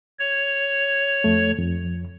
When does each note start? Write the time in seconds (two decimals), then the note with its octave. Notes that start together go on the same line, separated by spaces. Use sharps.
0.19 C#5
1.24 F2 A3
1.59 F2